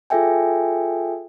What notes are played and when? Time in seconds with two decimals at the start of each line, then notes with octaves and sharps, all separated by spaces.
0.10 F4 G#4 A4 E5 G5 G#5